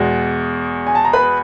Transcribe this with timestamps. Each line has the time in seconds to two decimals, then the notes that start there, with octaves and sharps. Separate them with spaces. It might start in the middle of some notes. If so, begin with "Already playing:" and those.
Already playing: E2 B2 G#3
0.87 G#5
0.95 A5
1.05 A#5
1.13 B4 B5